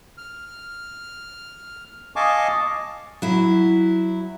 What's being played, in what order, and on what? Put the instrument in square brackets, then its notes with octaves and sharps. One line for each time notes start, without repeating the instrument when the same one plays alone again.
[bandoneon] F6
D#5 F5 G#5 A5 C#6 D6
[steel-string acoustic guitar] F#3 E4